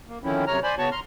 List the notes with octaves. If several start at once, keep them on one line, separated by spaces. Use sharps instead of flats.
A#3
D3 D#3 F3 C4 C#4 E4
F#2 C3 C#5 A#5 F6
C5 D5 G#5 B5
C#3 B3 F#4 C#5 A5 C#6
A#5 C6 F6